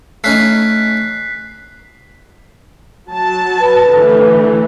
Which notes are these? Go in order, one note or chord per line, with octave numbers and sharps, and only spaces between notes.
A3 C#4 D#4 F#6 B6 C7
F#3 A5
B4
D3 E3 A3